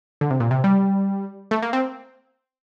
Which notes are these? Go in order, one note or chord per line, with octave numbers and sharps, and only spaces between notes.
D3
C3
A#2
C3
G3
A3
A#3
C4